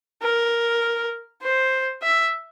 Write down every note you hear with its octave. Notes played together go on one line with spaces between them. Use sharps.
A#4
C5
E5